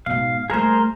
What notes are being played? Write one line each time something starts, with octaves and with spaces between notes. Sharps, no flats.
G#2 B2 F5
G3 A3 G#4 A#4 C5